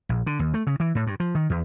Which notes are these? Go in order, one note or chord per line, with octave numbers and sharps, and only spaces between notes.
A#1
D3
D#2
A3
C#3
E3
A2
G2
F3
D#3
E2